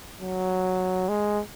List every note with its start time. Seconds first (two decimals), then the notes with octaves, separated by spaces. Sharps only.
0.21 F#3
1.09 G#3